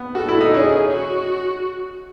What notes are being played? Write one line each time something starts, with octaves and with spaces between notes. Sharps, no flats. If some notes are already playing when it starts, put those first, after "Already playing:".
Already playing: B3
F#4 A4
E4
D#4
C#4 G#4
F#4